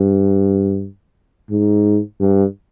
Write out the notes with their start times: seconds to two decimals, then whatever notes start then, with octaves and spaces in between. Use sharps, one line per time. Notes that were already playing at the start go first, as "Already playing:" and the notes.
Already playing: G2
1.51 G#2
2.20 G2